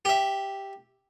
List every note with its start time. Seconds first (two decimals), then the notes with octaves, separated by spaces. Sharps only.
0.05 G4 E5